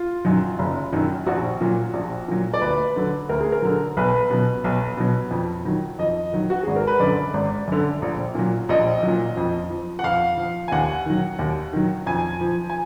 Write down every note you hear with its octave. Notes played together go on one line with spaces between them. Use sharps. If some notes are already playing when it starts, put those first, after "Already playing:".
Already playing: F4
F#2 D#3 F#3
F#1
F#2 D#3 F#3
A#1 F#4
A#2 F#3
A#1
A#2 F#3
D5
D2 B4
D3 F#3
D2 A#4
G#4
A#4
D3 F#3
B1 B4
B2 F#3
B1
B2 F#3
F2
D#3 F#3
F2 D#5
D#3 F#3
F#4
G#1 G#4
A#4
B4
F#2 D3 D5
G#1
F#2 D3
A#1
A#2 F#3
A#1 D#5
A#2 F#3
F2
F3
F#5
F2 F5
F3
G#5
D#2 F#5
D#3 F#3
D#2
D#3 F#3
F2 G#5
F3
G#5